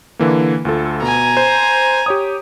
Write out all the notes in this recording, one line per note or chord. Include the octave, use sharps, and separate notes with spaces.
D3 E3 A#3
D2 F4 A4
B2 G#5 A#5
C5
G4 C#5 D#6